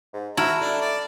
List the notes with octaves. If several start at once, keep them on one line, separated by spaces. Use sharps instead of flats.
G#2
E4 F#4 A5 A#5 F6 E7
A3 D4
D5